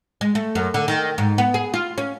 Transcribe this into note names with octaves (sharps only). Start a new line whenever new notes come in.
G#3
A3
F#2
D3
D#3
G#2
B3
G#4
F4
C#4